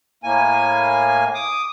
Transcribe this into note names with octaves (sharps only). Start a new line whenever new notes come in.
A2 A#3 G#5
D6 D#6